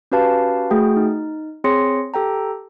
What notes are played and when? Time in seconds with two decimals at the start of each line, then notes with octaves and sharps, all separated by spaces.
0.12 C#4 F#4 G4 B4 F5 A5
0.70 A3 F#4 G#4 G5
0.96 D#4
1.64 C4 G#4 C#5 C6 A#6 C#7
2.14 G4 A4 G5 A#5